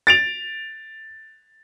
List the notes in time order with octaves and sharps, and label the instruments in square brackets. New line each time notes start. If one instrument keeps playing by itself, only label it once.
[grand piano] A6 D7 F7